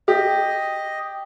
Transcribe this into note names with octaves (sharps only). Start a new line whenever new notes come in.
G4 D#5